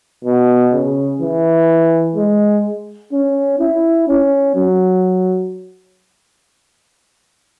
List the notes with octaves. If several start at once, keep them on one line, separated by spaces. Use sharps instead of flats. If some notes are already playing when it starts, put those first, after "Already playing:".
B2
C#3
E3
G#3
C#4
E4
C#4
F#3